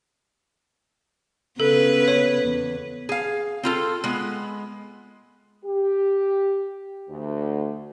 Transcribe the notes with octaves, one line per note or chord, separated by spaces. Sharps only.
C#3 B3 A4 B4
C#5
E2
G#4 F5
C4 F4 A4
G#3 B3
G4
D2